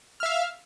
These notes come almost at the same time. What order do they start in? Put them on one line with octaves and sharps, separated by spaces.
F6 E5 F5